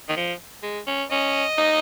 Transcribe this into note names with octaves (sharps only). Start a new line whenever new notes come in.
D#3
F3
G#3
C#4
C#4 D#5
D#4